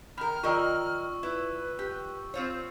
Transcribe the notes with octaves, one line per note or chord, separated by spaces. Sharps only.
D#3 A#4 B5 F6
D#3 F4 A#4 D5 D#5 G5 C#6 E6
E4 B4
G4
C4 F4 C5 C#5